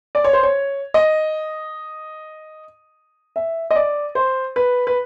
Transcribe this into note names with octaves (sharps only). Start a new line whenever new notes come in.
D5
C#5
C5
C#5
D#5
E5
D#5
D5
C5
B4
B4